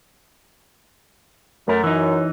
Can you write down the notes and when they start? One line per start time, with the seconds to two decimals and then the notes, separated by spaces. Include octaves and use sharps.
1.68 F#2 A3 A#4
1.84 E3 D#4